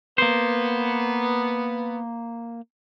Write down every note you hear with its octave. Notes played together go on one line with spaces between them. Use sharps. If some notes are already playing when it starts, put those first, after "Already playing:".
A#3 B3 C5